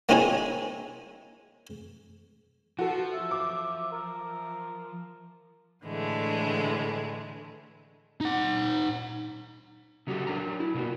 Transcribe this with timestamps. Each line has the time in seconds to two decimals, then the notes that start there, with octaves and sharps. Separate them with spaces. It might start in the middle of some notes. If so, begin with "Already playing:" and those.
0.09 A#3 C4 C#4 D#4 E4 G#4
2.79 F3 F#4 A4
3.13 E5
3.31 D6
3.92 A#4
5.85 A2 D3 E3 G#3 A3
8.21 D#4 F#5
10.07 C#3 F#3 A#3 F#4 G4 A4
10.27 F#3 D4 A#4 A#5
10.60 E4
10.74 B2 A3 A#3 F4 F#4